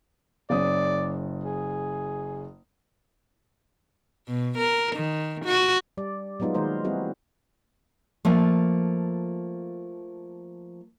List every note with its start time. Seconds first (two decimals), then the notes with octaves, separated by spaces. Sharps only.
0.50 F#1 C#4 D5 D#6
1.44 G#4
4.28 B2
4.58 A#4
4.96 D#3
5.45 F#4
5.97 G3 D5
6.40 F#3 G#3 B3 D#4 F4
6.55 D#3 G#3 A#3 A#4 C5
6.84 G3 C4 E4 F#4 G#4
8.25 F3 A3 A#3 F4